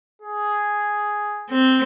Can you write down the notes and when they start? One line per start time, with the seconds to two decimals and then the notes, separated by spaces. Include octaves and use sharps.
0.22 G#4
1.50 C4